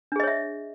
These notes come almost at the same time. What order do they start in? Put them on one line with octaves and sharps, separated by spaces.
D4 G#4 D#5 C#5 E5